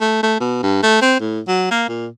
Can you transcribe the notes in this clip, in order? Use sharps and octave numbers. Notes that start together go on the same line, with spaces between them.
A3
A3
B2
G2
A3
C4
A2
F#3
A#3
A#2